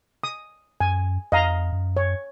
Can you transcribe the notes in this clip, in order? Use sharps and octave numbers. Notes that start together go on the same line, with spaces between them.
D#6
F#2 G#5
F2 D#5 F5 A#5
F#2
C#5